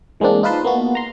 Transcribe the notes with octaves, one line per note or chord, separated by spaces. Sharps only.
E3 G#3 A#3 C4 D4
D#4 F4 A#4 B4 A5 C6
A#3 B3 F#4
A#5 C6